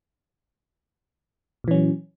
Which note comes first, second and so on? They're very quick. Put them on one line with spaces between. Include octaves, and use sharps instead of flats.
A#2 E3 C#4 F#3